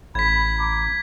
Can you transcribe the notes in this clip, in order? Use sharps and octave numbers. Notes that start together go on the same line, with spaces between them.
A1 B5 G#6 B6
A#5 D6